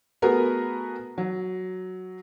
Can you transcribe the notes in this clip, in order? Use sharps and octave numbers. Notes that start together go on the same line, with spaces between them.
A3 B3 F#4 G#4 A#4 B4
F#3